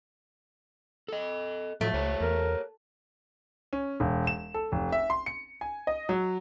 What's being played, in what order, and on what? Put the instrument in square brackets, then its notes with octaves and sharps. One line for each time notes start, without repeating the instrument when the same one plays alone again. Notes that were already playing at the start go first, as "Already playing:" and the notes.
[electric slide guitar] A4 D#5
[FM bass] A2 [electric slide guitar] F3 F#3 [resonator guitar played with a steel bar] A3
[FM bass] C#2 [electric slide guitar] G4 C5 C#5
[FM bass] E2 [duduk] A#4
[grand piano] C#4
E1
E7
A4
F1
E5
C6
C#7
G#5
D#5
F#3